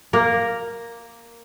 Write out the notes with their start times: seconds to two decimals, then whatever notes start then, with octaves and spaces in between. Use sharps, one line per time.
0.13 A#3 A#4